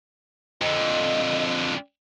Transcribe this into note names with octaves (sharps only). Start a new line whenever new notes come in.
F2 D3 D#5